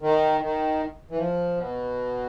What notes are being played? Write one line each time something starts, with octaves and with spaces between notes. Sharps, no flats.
D#3
D#3
E3
F3
B2